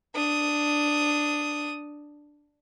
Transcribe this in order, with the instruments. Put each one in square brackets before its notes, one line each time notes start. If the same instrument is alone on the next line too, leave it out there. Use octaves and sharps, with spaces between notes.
[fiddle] D4 D#6